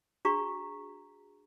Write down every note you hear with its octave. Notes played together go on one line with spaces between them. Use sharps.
D4 F#4 G#4 A#5 C#6